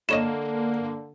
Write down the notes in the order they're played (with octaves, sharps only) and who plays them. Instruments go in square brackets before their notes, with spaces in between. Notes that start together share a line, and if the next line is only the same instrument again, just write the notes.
[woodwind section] D3 [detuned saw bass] A#3 [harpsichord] E4 C#5 D#5 [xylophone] E7